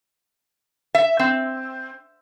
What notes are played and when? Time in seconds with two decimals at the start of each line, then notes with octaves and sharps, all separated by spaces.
0.95 E5
1.19 C4